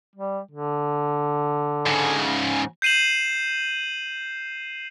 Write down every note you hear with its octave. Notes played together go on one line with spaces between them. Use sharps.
G3
D3
G#2 C#3
G6 C7 D#7 E7 F#7